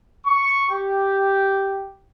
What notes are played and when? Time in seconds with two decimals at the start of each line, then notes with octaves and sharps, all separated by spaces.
0.25 C#6
0.69 G4